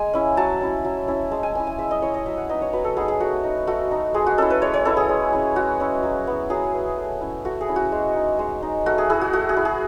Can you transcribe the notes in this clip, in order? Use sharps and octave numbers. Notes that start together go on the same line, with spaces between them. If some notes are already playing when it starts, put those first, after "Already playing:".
Already playing: G#3 G#5
C#4 E4
F#3 A5
C#4 E4
F#3
C#4 E4
G#3 A5
G#5
C#4 E4 G#5
G#5
G#3 E5
D#5
C#4 E4 C#5
D#5
F#3 E5
F#5
B3 D#4 D#5
C#5
F#3 B4
A4
B3 D#4 G#4
G#4
A3 F#4
D#4
A3 F#4
D#4
G#3 G#4
F#4
C#4 E4 A4
B4
G#3 C#5
C#5
C#4 E4 A4
G#4
G#3
C#4 E4
G#3 F#4
C#4 E4
F#3
B3 E4
F#3 G#4
B3 E4
A3
C#4 E4
A3 F#4
G#4
C#4 E4
F#4
G#3
D#4
G#3
D#4
A3 F#4
G#4
E4 G#4
F#4
A3 F#4
G#4
E4
G#4